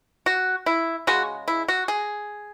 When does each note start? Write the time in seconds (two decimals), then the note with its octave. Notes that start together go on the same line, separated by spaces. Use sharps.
0.26 F#4
0.66 E4
1.07 C#3 G#3 F#4
1.48 E4
1.68 F#4
1.88 G#4